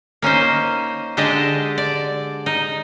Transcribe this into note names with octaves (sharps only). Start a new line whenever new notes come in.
A#3 C#4 D#4 C5
D3 G#3 G4 A4 D#5
D5
D#4